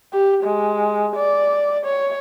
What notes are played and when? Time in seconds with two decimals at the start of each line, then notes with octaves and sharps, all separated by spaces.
0.13 G4
0.44 G#3
1.16 D5
1.86 C#5